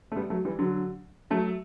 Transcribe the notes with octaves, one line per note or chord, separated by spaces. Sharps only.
A3
G3 B3
F#3 A3
E3 G3
D3 F#3
F#3 A3